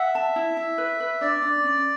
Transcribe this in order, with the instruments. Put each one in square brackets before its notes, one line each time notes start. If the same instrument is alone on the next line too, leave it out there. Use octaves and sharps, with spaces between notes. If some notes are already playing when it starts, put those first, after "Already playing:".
Already playing: [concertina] E5 [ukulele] F#5
[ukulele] A5
E4
E4
B4
B4
[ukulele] D4 [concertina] D5
[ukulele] D4
C#4